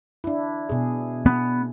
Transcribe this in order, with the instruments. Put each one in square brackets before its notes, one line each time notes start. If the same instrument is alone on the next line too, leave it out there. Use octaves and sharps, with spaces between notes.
[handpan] D4 E4
B2 G#4
[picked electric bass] B3